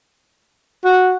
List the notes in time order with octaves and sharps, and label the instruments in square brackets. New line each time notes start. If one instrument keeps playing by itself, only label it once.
[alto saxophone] F#4